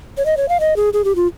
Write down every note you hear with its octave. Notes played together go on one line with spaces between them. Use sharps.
C#5
D#5
C#5
F5
D#5
G#4
G#4
G4
F4